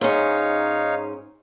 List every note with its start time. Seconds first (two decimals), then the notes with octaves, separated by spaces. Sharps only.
0.01 G#2 C#4 D#4 C#5 F5